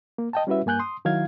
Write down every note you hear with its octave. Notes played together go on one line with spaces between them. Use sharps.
A#3
D#5 G5 A5
G3 C#4 E4 F#4 B4 E5
G2 A#3 G#5 F#6 G6
C6 D#6
D#3 F#3 E4 F5 G#6